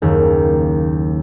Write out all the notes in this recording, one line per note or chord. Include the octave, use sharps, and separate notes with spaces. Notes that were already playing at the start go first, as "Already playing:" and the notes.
F#1 D#2